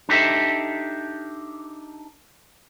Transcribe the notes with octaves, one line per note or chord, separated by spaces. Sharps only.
D4 D#4 G4 A4 E5